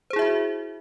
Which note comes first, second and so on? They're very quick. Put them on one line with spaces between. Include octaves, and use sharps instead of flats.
C5 G#4 E4 E5 F#4